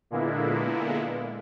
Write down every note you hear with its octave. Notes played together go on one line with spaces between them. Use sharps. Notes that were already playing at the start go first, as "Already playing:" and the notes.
A#2 D3 G#3 A#3 B3 E4